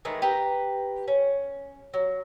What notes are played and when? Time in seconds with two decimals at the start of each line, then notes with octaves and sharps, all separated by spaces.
0.05 D#3 E3 G#3 A3
0.22 G4 B4 A#5
1.08 C#4
1.94 F#3